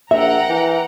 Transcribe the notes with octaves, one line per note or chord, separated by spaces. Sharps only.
A#1 E5 F#5 G5 A#5
E3